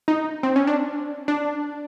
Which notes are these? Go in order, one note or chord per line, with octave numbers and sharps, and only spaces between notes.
D#4
C4
C#4
D4
D4